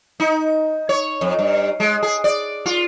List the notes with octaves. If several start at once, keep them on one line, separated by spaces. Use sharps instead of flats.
D#4
C#5
F2
G2
G#3
G#4
D5
F4